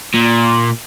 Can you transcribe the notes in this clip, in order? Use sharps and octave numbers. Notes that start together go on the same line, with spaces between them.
A#2